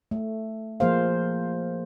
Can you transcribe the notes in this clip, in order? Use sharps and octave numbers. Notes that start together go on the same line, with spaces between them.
A3
F3 A#3 G#4 C5 F5